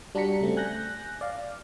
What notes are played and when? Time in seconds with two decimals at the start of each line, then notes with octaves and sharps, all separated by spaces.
0.15 G3 D4 F#4 A#5 B6 C#7
0.41 C#3 A3 C4
0.57 G#5 F#6 G6 A#6
1.21 D5 F5